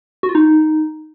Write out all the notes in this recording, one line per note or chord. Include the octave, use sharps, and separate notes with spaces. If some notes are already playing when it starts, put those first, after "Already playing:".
F#4
F4
D#4